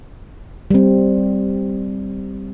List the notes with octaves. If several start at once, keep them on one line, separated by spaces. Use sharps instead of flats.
G3 C4